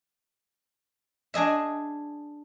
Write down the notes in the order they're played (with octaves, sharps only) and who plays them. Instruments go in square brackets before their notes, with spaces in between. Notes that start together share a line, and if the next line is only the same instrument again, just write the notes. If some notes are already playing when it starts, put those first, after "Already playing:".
[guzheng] D4 G#4 D#5 E5